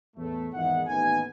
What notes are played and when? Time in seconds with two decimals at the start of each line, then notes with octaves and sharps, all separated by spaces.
0.16 E2 A2 A3
0.53 G#1 E2 D#3 E5 F#5
0.86 A1 D#2 A2 B3 D#4 G#5